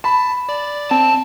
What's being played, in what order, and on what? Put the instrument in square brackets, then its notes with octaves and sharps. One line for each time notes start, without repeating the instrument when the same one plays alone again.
[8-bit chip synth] A5 [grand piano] B5
[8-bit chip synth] D5
[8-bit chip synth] C4 [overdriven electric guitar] A5